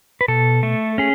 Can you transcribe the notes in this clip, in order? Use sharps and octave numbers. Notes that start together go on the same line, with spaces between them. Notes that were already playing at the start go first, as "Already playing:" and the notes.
B4
B2 A4
A3
C#4 G#4